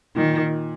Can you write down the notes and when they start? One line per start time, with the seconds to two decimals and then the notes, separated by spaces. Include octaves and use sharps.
0.16 A#2 D#3